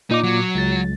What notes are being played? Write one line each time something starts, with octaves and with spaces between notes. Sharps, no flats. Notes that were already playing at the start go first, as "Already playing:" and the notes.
A#2 D#4 D6
F#3
C#2 A6